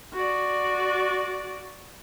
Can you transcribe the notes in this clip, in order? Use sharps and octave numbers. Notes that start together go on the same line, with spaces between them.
F#4 D5